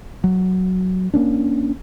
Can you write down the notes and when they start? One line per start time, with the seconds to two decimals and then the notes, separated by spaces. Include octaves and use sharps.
0.24 F#3
1.14 A#3 C#4 D4